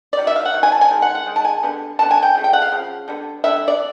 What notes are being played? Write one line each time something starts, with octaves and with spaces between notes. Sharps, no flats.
D5
D#3 F#3
E5
F5
F#5
D#3 F#3
G#5
A5
G#5
D#3 G#3
F#5
F#5
D#3 G#3
A5
G#5
D3 G3 B3
D3 G3 B3 A5
G#5
G5
C#3 F3 A3
G5
F#5
F5
C#3 F3
D3 G3 B3
D3 G3 B3 E5
D5